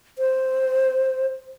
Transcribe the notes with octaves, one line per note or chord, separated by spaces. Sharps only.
C5